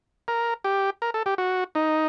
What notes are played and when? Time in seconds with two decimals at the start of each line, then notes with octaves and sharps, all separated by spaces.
0.28 A#4
0.64 G4
1.02 A#4
1.14 A4
1.26 G4
1.38 F#4
1.75 D#4